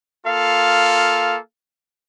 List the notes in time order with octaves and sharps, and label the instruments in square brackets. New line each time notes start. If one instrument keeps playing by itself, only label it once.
[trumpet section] A#3 F4 A4 F5